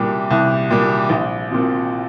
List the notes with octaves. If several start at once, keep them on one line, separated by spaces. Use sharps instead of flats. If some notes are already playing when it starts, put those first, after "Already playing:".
Already playing: C2 A#2 G3
C2
A#2 G3
A#1
A#2 F3 C4